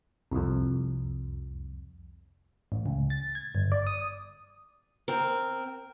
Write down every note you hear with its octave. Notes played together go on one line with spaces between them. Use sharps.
C2 F2
A1
C#2
A6
G#6
G1
D5
D#6
C4 A#4